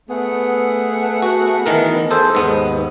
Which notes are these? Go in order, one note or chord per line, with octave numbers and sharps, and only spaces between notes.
A3 B3 G#4 F#5
F#4
D#3 E3 A#4
G#4 A4 C5
D#2 G#2 B3